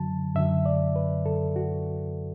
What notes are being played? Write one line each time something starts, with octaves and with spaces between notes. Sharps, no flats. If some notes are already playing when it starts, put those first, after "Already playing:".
Already playing: F#2 D3 F#3 A5
F#2 D3 F#3 E5
D5
B4
F#2 D3 F#3 A4
F#4